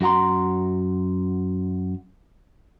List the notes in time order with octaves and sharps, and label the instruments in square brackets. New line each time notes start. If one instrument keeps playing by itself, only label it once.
[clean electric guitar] F#2 F#4 F#5 A#5 C6